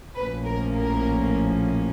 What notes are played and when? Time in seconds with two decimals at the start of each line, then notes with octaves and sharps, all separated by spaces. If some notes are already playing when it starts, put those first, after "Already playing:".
0.15 A#1 A2 F3 A#3 C#4 B4
0.45 A#4
0.75 A#4